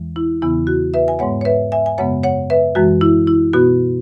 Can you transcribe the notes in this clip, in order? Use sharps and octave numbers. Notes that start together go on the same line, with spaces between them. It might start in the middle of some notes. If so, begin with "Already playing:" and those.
Already playing: E2 E3 G#3
E4
E2 C#3 E3 B3 E4
F#4
B4 E5
G#5
G#2 G#3 B3 C#5 F#5
C#5
B4 E5
E5 G#5
G#5
F#2 C#3 G#3 B3 C#5 F#5
C#5 F#5
B4 E5
F#2 E3 G#3 F#4
E4
E4
B2 B3 F#4